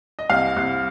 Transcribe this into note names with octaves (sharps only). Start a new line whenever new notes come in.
D#5
C2 F5
C2